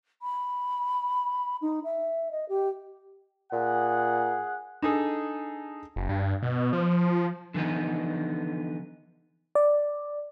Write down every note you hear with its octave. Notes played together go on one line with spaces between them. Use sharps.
B5
D#4
E5
D#5
G4
A#2 G#4 F#5
D4 D#4 G#4 A4
F#1
G2
B2
F3
D3 E3 F3 B3 D#4
D5